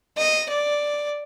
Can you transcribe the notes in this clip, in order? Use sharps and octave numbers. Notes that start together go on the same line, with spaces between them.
D#5
D5